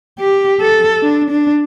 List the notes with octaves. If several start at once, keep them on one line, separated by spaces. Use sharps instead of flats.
G4
A4
D4
D4